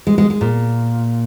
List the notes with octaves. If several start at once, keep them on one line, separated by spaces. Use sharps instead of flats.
G#3
G#3
G#3
A#2